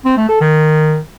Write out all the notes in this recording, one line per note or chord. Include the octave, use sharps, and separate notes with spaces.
C4
A3
A4
D#3